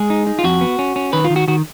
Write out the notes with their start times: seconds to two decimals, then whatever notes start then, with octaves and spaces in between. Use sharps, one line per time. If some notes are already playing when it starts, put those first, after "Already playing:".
Already playing: G#3 G#4
0.10 D#4
0.27 D#4
0.39 F4
0.44 F2 F#4
0.61 B3
0.79 C#4
0.96 C#4
1.13 D#3 B4
1.24 F4
1.30 D#3
1.36 F#4
1.48 D#3 F#4